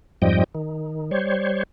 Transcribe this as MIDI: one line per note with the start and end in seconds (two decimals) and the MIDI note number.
0.22 0.44 41
0.22 0.44 44
0.22 0.44 53
0.22 0.44 55
0.22 0.44 75
0.22 0.44 79
0.55 1.11 51
1.11 1.63 55
1.11 1.63 72
1.11 1.63 73